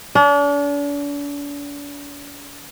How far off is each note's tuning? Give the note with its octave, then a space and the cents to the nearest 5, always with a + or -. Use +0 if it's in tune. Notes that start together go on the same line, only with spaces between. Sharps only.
D4 -40